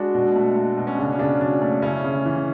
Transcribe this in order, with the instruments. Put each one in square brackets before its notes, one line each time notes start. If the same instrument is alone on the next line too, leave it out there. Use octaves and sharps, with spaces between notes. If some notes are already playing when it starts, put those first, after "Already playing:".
Already playing: [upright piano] G#3 D4 F#4
B2
A3
A3
B2
C#4
C#3 D4
C#4
C#3 D4
F#3 D4
A3 D4
C#3 C#4 E4
C#3
E3